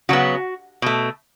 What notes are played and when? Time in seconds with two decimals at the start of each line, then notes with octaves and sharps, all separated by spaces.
0.09 C#3 F#3 B3 F#4
0.82 B2 A3